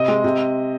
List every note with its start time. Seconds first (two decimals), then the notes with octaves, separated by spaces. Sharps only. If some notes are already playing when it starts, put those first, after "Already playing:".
Already playing: C3 D#5
0.08 G#3
0.24 C3